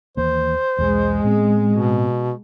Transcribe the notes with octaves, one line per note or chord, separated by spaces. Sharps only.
D#2 E3 A#3 C5
B1 E2 G#3
A2 B3 C4
B2